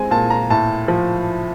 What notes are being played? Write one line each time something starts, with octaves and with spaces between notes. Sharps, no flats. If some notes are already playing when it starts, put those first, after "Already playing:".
Already playing: G#3 C4 G#5
A#2 A5
A#5
A2 A5
F3